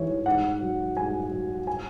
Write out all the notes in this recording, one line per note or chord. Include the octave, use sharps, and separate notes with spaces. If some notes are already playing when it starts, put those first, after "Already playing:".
Already playing: G#2 E3 C#5
G#2 F#5
F#3
G#2 G#5
F#3
G#5